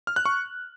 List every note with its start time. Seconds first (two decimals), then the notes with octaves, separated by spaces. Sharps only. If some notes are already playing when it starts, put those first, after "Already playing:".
0.07 F6
0.16 F#6
0.25 C#6